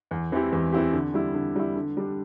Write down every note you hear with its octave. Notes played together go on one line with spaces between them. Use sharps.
E2
E3 C4 E4 G4
E2
E3 C4 E4 G4
D3
G3 E4
D3
G3 E4
D3
G3 D4